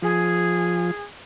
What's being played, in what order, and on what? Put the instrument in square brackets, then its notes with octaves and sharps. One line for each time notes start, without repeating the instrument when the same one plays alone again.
[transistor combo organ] F3 [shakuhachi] G#4